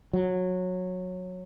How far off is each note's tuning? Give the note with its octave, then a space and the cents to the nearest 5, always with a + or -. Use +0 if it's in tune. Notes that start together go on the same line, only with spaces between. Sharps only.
F#3 -15